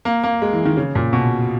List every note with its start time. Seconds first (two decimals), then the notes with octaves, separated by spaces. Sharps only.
0.05 A#3
0.24 A#3
0.42 G#3
0.53 E3
0.65 D#3
0.77 C#3
0.95 A#2
1.13 B2